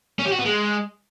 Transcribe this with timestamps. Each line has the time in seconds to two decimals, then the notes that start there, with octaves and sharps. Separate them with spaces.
0.19 C#4
0.26 G4
0.32 F#4
0.39 B3
0.45 G#3